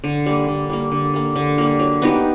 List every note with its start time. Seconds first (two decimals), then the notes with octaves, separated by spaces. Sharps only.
0.04 D3
0.26 G3 A#3
0.48 D3
0.70 G3 A#3
0.92 D3
1.14 G3 A#3
1.36 D3
1.58 G3 A#3
1.80 F#3
2.02 B3 D#4 G4